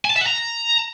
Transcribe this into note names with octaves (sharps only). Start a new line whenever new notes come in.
G#5
A5
E5
F#5
A#5